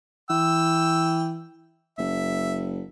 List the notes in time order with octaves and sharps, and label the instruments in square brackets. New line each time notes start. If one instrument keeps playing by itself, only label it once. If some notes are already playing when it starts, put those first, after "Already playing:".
[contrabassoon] E3 [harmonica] G5 E6
[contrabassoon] F#1 [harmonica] E5